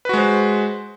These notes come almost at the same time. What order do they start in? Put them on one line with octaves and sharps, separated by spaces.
B4 F#4 G#3 C5